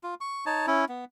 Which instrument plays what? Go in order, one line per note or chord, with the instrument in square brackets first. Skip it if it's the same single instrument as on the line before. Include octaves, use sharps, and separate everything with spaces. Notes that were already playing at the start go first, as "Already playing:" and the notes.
[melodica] F4
C#6
D#4 C#5 A5
C#4 E4
B3